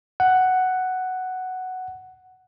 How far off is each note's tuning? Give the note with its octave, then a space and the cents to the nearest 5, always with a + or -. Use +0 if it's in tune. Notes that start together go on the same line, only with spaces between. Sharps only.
F#5 +5